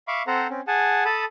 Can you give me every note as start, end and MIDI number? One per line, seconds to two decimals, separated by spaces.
0.08 0.23 76
0.08 0.23 77
0.08 0.23 83
0.08 0.23 85
0.08 0.23 86
0.27 0.47 60
0.27 0.47 69
0.27 0.47 72
0.27 0.47 78
0.27 0.47 82
0.50 0.61 60
0.50 0.61 61
0.67 1.04 68
0.67 1.04 78
0.67 1.04 80
0.67 1.04 81
1.05 1.25 69
1.05 1.25 81
1.05 1.25 83
1.05 1.25 87